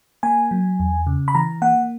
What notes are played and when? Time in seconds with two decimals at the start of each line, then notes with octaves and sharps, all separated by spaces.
0.23 A#3 G#5
0.51 F#3
0.80 E2
1.07 C#3
1.28 B5
1.35 E3 A#5
1.62 A#3 F#5